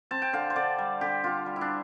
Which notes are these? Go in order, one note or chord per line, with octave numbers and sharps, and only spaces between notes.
C4 A5
G5
D3 F5
C5
D3 D5
G3
D3 G4
D3 F4
G3
E4
D4